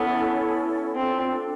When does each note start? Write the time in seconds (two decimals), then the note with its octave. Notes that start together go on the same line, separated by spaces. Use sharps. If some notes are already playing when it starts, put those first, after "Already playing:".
Already playing: B3 C#4 E4 A4
0.95 C4 D4 F4 A4